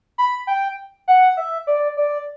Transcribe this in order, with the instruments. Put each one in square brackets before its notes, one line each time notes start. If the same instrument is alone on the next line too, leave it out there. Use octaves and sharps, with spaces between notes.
[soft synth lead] B5
G5
F#5
E5
D5
D5